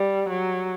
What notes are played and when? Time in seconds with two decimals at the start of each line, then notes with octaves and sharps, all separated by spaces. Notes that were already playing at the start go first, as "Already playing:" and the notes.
Already playing: G3
0.29 F#3